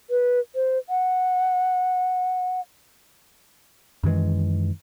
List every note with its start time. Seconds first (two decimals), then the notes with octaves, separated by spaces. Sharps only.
0.10 B4
0.55 C5
0.89 F#5
4.03 F#2 D#3 E3 G#3